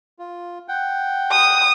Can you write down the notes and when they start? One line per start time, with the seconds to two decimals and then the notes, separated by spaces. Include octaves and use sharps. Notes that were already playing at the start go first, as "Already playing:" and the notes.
0.19 F4
0.68 F#5 G5
1.31 D#6